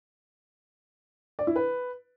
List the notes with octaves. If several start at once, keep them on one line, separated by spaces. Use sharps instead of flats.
D5
E4
B4